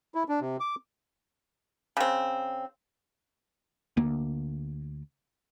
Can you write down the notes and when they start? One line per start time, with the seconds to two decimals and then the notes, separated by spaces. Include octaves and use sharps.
0.15 E4
0.29 D4
0.41 C3
0.60 D6
1.97 C#3 C4
3.97 D2 A#3